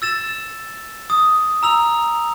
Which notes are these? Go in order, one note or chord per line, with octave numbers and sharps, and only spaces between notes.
E6 A6 E7
D#6
A#5 E6 F7